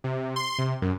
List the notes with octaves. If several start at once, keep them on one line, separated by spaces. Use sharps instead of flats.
C3
C6
C3
F#2